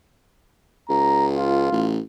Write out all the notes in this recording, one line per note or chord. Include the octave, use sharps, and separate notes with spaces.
C#2 A#5
F4
A1